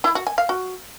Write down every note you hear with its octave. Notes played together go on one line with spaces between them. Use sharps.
E4
F#4
G#5
F5
F#4